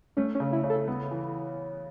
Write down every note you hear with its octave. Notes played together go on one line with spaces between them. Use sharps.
A3 C#4
C#4
C#3
E4
C#3
A4
B3
E3